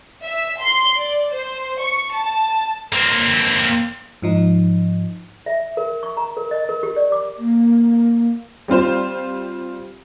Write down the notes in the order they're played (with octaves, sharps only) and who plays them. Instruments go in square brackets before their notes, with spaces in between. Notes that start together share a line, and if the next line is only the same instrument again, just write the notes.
[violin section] E5
C6
D5
C5
C#6
A5
[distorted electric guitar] A#3 C4
[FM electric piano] G#2 F3 D#4
[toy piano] E5
A#4
C#6
A#5
A#4
D#5
A#4
G4
D5
D6
[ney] A#3
[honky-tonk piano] G3 C4 F4 C5